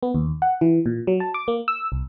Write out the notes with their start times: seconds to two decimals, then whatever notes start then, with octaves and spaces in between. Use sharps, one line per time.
0.03 B3
0.14 D#2
0.42 F#5
0.61 E3
0.86 A#2
1.07 F#3
1.20 A5
1.34 D6
1.48 A#3
1.68 E6
1.92 C2